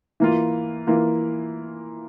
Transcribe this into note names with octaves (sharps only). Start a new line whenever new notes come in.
E3 A#3 F4
E3 A#3 F4